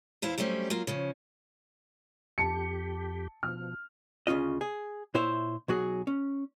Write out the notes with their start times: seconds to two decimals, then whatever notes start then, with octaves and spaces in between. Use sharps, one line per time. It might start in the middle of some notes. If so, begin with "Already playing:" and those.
0.22 E2 E4 C5 F5
0.38 F#3 G3 A3 C4 C#4
0.70 F#3 A#3 F4
0.87 C#3 F3 C#4
2.38 F2 G4 A5 C#7
3.43 B2 F3 F6
4.27 D2 C#3 C#4 F4 D#5
4.61 G#4
5.14 A#2 E4 C5 C#5 E5
5.68 B1 F#3 F#4 G#4
6.07 C#4